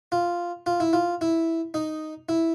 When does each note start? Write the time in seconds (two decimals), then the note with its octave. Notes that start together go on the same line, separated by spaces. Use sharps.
0.12 F4
0.66 F4
0.80 E4
0.93 F4
1.21 E4
1.74 D#4
2.29 E4